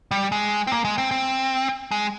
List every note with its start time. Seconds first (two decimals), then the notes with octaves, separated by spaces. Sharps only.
0.11 G3
0.32 G#3
0.67 C4
0.72 A#3
0.85 G#3
0.98 C4
1.11 C4
1.91 G#3